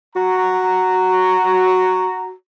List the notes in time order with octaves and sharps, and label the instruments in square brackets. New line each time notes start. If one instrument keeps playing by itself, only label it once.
[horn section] F#4 A#5